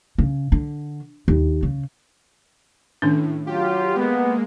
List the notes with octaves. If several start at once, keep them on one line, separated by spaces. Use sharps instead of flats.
C#3
D3
D#2
C#3
A2 D#3 C#4 D4
F#3 F4 G4
G#3 A#3 B3